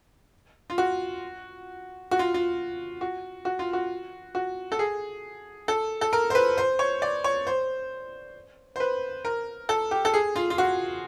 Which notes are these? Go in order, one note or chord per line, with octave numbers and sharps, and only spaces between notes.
F4
F#4
F#4
F4
F4
F#4
F#4
F4
F#4
F#4
A4
G#4
A4
A4
A#4
C5
B4
C5
C#5
D5
C#5
C5
C5
B4
A#4
A4
G4
A4
G#4
F4
F4
F#4